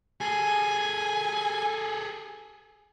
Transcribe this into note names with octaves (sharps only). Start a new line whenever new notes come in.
G#4 A4 G#5